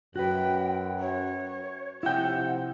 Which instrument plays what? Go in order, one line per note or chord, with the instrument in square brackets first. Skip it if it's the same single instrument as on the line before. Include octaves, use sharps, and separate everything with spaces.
[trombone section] F#2 [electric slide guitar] F#4 B4 [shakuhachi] G5
[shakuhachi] C#5
[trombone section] C3 F3 [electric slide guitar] E4 G5 [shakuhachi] F#5